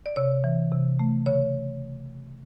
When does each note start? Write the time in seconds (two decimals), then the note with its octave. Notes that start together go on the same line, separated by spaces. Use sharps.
0.06 D5
0.16 C3 C#5
0.44 E3
0.72 C3
0.99 A3
1.26 C#3 C#5